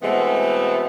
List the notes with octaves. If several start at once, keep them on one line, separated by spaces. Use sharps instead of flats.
B2 E3 G#3 A3 B3 C4